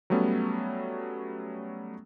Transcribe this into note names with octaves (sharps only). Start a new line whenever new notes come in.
F#3 G3 A3 B3 C#4